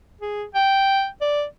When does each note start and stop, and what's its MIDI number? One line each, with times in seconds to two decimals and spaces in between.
0.21 0.44 68
0.55 1.07 79
1.21 1.44 74